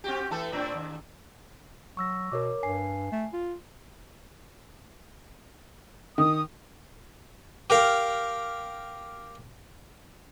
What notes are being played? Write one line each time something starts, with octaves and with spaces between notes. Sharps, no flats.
C4 F#4 G4
E3 A3 A4
A2 C4 D4
D#2
F#3 C#6 E6 A#6
B2 A#4 C#5 D6
G2 G#5 C7
A3
F4
D#3 D#6
G4 A#4 F5